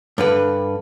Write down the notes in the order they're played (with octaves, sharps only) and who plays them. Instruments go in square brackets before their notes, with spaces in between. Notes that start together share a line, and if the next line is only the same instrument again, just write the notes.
[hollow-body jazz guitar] G2 D3 B4